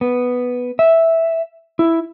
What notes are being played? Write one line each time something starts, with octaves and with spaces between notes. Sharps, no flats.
B3
E5
E4